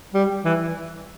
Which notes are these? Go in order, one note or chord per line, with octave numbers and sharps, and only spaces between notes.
G3
E3